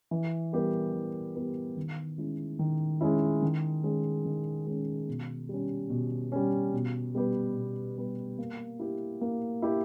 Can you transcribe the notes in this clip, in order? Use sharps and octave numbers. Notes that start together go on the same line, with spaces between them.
E3
G3 B3 G4 A#4
E3
G3 B3 G4 A#4
D#3
G#3 C#4 E4
D#3
G#3 C#4 E4
D#3
G#3 C#4
D#3
G#3 C#4
B2
G3 C#4
B2
G3 C#4
B2
G3 B3 G4 B4
B2
G3 B3 G4 B4
A#3
E4 G4
A#3
E4 G4